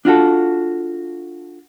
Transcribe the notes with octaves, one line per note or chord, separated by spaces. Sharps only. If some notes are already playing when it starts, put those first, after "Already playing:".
D4 F4 F#4 A4